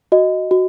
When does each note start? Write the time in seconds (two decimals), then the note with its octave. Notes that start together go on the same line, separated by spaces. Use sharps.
0.12 F#4 D#5
0.51 F#4